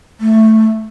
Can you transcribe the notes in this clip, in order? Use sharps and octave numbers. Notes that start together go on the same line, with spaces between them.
A3